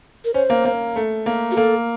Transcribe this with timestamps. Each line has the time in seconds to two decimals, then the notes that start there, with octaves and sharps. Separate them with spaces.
0.25 A#4
0.34 C#4 C5
0.50 A#3
0.65 A#3
0.96 A3
1.26 A#3
1.52 F#4
1.56 A#3 A4